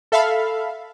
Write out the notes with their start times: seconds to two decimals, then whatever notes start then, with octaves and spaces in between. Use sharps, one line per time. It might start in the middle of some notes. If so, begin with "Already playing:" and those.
0.12 A4 E5 F5 B5